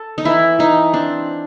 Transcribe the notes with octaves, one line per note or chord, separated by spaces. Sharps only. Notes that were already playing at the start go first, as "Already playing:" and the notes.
Already playing: A4
D#4
E3 E4
E3 D#4
C4 D4